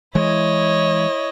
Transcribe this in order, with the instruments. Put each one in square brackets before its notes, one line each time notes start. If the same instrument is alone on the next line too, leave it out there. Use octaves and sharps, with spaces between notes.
[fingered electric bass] E3 G#3 [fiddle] E4 D#5 [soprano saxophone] C#5